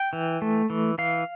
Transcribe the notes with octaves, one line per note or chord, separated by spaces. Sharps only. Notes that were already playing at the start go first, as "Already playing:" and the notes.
Already playing: G5
E3
A3
E3
E3 F5